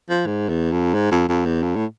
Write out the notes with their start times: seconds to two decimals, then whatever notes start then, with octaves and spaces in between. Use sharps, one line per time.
0.10 F3
0.26 G#2
0.49 E2
0.72 F2
0.95 G#2
1.12 F2
1.29 F2
1.45 E2
1.63 F2
1.76 A2